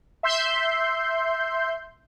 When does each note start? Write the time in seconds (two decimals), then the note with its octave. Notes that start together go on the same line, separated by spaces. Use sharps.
0.23 E5 C6 G6